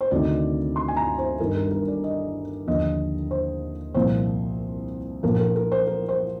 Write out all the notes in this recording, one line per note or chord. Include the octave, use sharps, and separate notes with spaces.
C5
D2 C3 D#3 D5
C6
G#5
A#5
C5
G1 G2 D#3 A#4
A#4
A#4
D5
D#5
D#2 D3 F3 D#5
C5
C2 A#2 F3 C5
A#1 A#2 F3 A#4
A#4
A#4
C5
A#4
C5